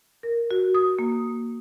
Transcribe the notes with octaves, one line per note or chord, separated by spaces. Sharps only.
A#4
F#4
D#6
A#3